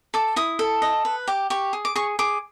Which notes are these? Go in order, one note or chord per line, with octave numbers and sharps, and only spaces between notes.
A4 D6
E4 D#6
A4
D#5
B4
G4 D6
G4 C#6
G#4
D6
G#4 C#6
G#4 D6